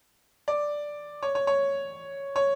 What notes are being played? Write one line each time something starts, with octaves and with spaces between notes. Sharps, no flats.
D5
C#5
C#5
C#5
C#5